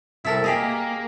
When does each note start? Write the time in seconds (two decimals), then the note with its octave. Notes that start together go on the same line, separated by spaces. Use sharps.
0.25 C2 E4 A4 A#4
0.44 A#3 G4 G#4 D#5